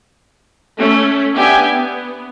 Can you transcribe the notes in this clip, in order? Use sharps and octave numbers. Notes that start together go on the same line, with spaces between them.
A3 C#4
B3 D4 G4 E5 G#5
B3